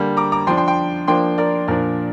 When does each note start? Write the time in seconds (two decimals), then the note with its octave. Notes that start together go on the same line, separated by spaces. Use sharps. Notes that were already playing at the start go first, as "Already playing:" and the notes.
Already playing: D3 G3 A#3
0.17 A#5 D6
0.32 A#5 D6
0.47 F3 G5 C6
0.51 D4
0.57 G5 C6
0.67 G5 C6
1.08 F3 A#3 D4 G5 C6
1.38 A#4 D5
1.68 A#2 F3 D4 A#4 D5